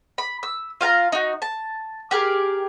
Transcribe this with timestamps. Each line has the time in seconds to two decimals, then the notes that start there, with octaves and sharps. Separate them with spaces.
0.18 B5
0.43 E6
0.81 F4 F5 G#5 A#5
1.12 D#4 F#4
1.42 A5
2.11 G4 G#4 A#4